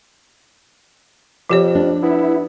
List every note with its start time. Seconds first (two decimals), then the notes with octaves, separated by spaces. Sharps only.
1.50 F2 F3 G4 C#5
1.75 D4
2.03 B3 E4